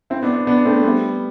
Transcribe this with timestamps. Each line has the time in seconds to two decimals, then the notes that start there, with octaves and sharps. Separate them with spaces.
0.10 C4 E4
0.23 B3 D4
0.47 B3 D4
0.65 A3 C4
0.84 G3 B3